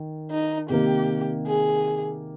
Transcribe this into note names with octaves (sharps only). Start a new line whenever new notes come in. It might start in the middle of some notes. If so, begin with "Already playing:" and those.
Already playing: D#3
D#4
C3 D#3 A#3 G4
G#4